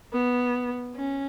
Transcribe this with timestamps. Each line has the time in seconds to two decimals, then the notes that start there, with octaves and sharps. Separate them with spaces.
0.13 B3
0.96 C#4